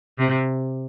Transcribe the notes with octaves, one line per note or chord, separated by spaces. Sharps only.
C3